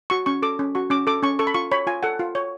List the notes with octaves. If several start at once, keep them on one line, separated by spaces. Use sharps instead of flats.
F#4 C#6
C#4 C#6
A4 D6
C#4
F#4 C#6
C#4 D6
A4 D6
C#4 C#6
A4 C#6
B5
F4 C#6
C#5 B5
F4 G#5
A4 F#5
F4
C#5